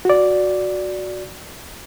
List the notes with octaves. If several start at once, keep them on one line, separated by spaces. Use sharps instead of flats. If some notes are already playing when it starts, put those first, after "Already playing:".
F#4 D5